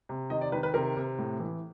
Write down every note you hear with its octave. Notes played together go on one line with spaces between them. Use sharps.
C3
D#3 D#5
D5
D#3 B4
B4
C3 A#4
C3
A2
E3